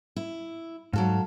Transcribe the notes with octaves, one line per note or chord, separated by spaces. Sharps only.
E4
G#2 F#3 A4 F5